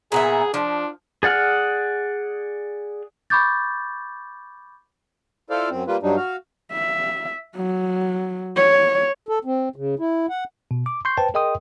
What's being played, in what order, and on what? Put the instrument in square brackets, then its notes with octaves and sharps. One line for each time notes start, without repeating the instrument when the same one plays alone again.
[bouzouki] A#2 B3 E5 [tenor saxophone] G#4
[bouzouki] F3 [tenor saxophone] D4
[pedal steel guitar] G#4 D5 F#5 F6
[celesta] B5 C#6 D6 G6 A6
[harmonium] E4 F4 A4 C5 D5 F5
F#2 C4
G3 A#3 F4 B4
G2 F#3 G3 D4 D#4
F#4 F5
[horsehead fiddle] E5
F#3
C#5
[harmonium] A4
C4
C#3
E4
F#5
[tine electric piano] B2
D6
C6 C#6 G6 C7
B4 C5 G5 A5
G#4 A#4 D#5 G5 C6 D#6